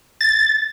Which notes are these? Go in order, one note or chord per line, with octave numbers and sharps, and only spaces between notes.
A6